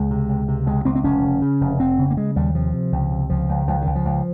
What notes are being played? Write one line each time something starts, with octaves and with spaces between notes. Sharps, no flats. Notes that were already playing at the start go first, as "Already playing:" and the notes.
Already playing: C#2 G#3
C3
C#2
C3
C#2 G#3
C#2 C4
C4
F1 C#4
C#3
C#3
F1
F1 C4
C#3
A#3
C#3 G#3
D#2 G3
C3 F3
C3
C#2
C3
C#2 F3
C#2
C#2 F3
C#2 D#3
F3
C#2